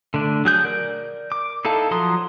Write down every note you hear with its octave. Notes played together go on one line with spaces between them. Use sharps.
D3 A3 D4
F#3 G#4 G6
A#4 D5
D6
D#4 E4 A4 F5 A5
F3 F#3 A#5 C6 D#6